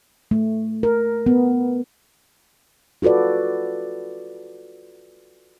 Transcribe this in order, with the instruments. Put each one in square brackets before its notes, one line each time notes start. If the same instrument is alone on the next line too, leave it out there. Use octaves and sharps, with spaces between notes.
[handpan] A3
A#4
B3
F4 F#4 A4 B4 D5